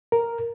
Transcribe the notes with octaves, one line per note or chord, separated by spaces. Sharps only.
A#4